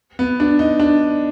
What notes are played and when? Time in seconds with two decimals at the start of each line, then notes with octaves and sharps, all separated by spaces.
0.19 B3
0.40 D4
0.59 D#4
0.80 D4